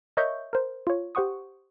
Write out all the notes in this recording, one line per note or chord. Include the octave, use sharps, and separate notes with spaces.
A#4 C#5 D#5 E5 C#6 G6
A#4 C5
F4 C#5
G4 C5 F#5 C#6 D#6